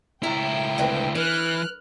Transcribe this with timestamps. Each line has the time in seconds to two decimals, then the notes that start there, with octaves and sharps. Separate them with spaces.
0.23 C#2 A2 E4 G5 A#5
0.78 D2 C4 B4
1.15 E3 B4 F6 F#6